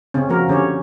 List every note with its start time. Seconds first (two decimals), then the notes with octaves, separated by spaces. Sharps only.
0.14 C#3 C4 C#4
0.29 F3 A#3 F#4 A#4
0.48 D3 C#4 G4 C#5